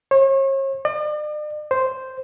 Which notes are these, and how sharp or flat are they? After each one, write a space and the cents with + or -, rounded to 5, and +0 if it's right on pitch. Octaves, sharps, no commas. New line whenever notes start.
C#5 -40
D5 +45
C5 -5